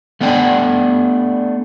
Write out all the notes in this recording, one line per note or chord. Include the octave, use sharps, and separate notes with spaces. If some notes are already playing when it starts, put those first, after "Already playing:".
A3 B3 D4 D5 G5